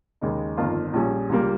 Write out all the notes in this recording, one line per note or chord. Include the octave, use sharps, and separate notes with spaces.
D#2 C#3 G#3 D#4
G1 F2 D#3 A#3 F4
A#1 A#2 G3 C#4 G#4
C#2 C#3 G3 A#3